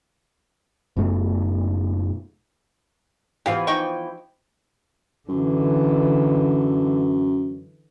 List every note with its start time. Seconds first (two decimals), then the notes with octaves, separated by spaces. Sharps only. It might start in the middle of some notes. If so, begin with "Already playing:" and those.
0.97 F#1 F#2 B2 A3
3.46 E3 F3 B3 G4 F5
3.67 D#4 G5 C#6
5.29 F#2 D3 E3